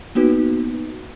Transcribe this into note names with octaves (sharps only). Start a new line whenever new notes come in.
A#3 B3 D#4 F#4 B4